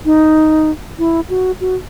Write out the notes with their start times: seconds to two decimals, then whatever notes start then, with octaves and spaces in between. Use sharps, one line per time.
0.05 D#4
0.99 E4
1.30 F#4
1.61 F#4